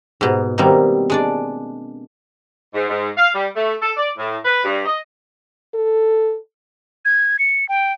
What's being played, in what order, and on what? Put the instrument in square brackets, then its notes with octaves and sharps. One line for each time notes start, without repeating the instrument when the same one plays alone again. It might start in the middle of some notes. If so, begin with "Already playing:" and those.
[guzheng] G#2 B2
B2 D#3 G3 A#3 C4
G#3 D4 D5
[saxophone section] G#2
G#2
F5
G3
A3
A4
D5
A2
B4
G2
D#5
[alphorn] A4
[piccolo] G#6
C#7
G5